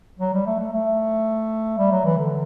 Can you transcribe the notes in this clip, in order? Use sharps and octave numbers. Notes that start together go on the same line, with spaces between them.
F#3
G3
A3
A3
A3
G3
F#3
E3
D3